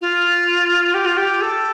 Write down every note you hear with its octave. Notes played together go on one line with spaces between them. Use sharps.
F4
G4
F4
G4
A4